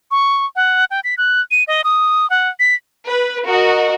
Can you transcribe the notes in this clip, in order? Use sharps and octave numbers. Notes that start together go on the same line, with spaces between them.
C#6
F#5
G5
B6
F#6
D#7
D#5
D#6
F#5
B6
B4
F#4 A#4 D#5